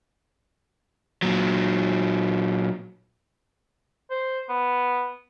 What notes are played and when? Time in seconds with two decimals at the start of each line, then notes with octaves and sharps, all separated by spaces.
1.22 A#2 F#3
4.10 C5
4.49 B3